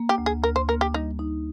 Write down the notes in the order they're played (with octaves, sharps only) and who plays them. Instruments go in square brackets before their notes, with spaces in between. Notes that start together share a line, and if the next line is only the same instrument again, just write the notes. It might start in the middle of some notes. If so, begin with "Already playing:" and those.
Already playing: [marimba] A#3
[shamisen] G4
[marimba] D2
[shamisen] G#4
[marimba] D2 [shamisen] A#4
[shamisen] C5
[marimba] A#3 [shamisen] A#4
[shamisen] G4
[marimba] G3 [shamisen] D#4
[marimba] D#4